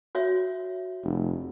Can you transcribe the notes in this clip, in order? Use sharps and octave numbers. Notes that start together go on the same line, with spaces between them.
F#4 C#5 E5
F1